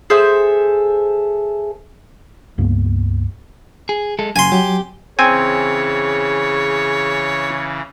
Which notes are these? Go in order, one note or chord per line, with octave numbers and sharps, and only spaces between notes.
G#4 A4 C5 E5
C#2 G2 A#3 B3
G#4
G#3 A4
F#2 C#3 G#5 C6
F#3 G4
C#3 E3 C4 G#4 C#5 G#5